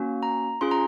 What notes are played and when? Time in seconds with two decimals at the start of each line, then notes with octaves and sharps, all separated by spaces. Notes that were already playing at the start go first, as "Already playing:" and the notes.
Already playing: A#3 C#4 F#4
0.23 A#5
0.61 C#4 F4 G#4 C6
0.71 A#5